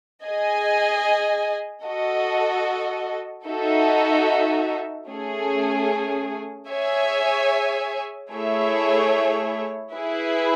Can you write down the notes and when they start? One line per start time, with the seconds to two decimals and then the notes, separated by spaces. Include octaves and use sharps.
0.22 G#4 D#5 G#5
1.84 F#4 A4 D#5
3.46 D#4 F#4 A4 E5
5.08 A3 C#4 G#4
6.69 G#4 C#5 E5 G#5
8.31 A3 E4 G#4 C#5 E5
9.93 E4 G#4 B4 E5